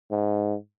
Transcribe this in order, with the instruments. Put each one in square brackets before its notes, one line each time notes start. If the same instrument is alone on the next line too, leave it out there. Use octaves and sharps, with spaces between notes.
[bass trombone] G#2